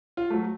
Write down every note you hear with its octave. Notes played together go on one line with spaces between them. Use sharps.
F4
F#3 A3